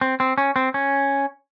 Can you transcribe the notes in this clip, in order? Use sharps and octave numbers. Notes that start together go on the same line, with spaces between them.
C4
C4
C#4
C4
C#4